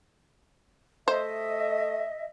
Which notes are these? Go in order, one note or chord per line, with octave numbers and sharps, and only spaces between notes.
A3 C5 D#5 E5